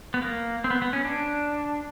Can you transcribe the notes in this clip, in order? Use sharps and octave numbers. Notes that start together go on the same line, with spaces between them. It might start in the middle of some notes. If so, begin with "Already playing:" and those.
B3
A#3
C4
B3
B3
C#4
D4